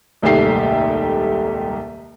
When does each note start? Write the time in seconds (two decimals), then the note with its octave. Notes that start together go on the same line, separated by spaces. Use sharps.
0.22 D#1 C2 G#2 A3 G4 C7